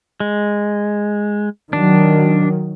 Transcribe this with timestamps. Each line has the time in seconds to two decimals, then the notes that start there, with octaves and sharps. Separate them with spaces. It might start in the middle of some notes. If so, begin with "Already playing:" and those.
0.20 G#3
1.73 D#3 F#3 D4